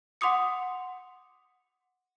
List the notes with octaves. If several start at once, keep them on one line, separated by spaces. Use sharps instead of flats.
F#5 C6 D6 D#6 C#7